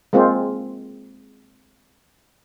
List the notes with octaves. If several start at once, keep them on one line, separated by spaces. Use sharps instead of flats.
G#3 A#3 C4 F4